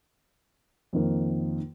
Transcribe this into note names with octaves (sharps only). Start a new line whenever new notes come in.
F2 D#3 A#3